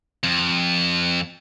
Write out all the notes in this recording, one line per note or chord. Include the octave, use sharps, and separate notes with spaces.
F2